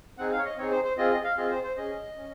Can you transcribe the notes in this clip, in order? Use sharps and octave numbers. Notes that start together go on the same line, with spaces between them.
C4 D#4 G#4 F#5
F5
C#5
D#5
C4 D#4 G#4 C#5
C5
C5
C4 F4 G#4 D#5
D#5
F5
C4 F4 G#4 D#5
C5
C5
C#4 G#4 D#5
C#4